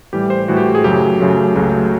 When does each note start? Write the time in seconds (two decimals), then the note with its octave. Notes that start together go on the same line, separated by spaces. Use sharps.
0.13 A2 E3 G3 G4
0.30 C5
0.48 A2 E3 G3 F#4
0.57 G4
0.75 G#4
0.84 F#2 C#3 F#3 A3 G4
1.20 F#2 C#3 F#3 A3
1.56 C#2 C#3 F#3 A3